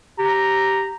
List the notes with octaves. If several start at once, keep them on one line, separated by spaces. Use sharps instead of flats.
G4 A#5